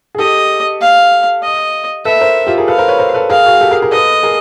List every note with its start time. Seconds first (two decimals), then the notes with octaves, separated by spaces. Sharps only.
0.15 G#4
0.18 G4 A4 D#5
0.81 F5
1.43 D#5
2.05 A4 B4 E5
2.21 A#4 C5
2.47 F4 G4
2.58 G#4 A#4
2.68 A4 B4 F5
2.78 A#4 C5
2.88 B4 C#5
2.99 A#4 C5
3.14 A4 B4
3.29 G#4 A#4 F5
3.46 F#4 G#4
3.61 G4 A4
3.71 G#4 A#4
3.82 G#4 A#4
3.92 A4 B4 D#5
4.23 G#4 A#4